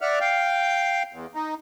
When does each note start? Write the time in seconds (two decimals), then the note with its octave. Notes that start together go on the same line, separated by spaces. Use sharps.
0.01 D5 E5 F#5 F6
0.21 F5 G5
1.13 E2
1.35 D#4